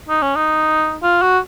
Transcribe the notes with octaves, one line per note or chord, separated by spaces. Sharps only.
D#4
C#4
D#4
F4
F#4